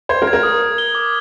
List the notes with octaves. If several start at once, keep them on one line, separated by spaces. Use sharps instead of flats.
C5 G#6
A#4
G#6
A#4
D#6
D#6
G7
D6